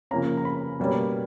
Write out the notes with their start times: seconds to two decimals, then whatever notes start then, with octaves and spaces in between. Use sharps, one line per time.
0.11 C#3 F3 A#3 C#4 A#5
0.37 A#5
0.45 B5
0.80 B2 G3 A#3 C#4